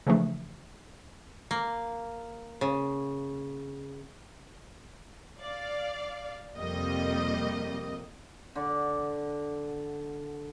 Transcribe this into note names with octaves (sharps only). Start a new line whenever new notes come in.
C#3 E3 F3 A3 D4
A#3
C#3
D5 F5
F2 C3 G3 A#3 D#5
D3 D5 F#5 D6